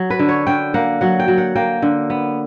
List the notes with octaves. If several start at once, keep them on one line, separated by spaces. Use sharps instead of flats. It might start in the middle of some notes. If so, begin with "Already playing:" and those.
Already playing: F#3
B4
D3
C#5
D3 G5
A#3 F#5
F#3 F#5
G5
F#3
F#5
A#3 G5
D3
B3